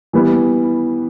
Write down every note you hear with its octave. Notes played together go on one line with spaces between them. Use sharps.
E3 G3 B3